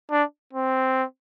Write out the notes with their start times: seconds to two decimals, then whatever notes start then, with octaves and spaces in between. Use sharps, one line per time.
0.11 D4
0.53 C4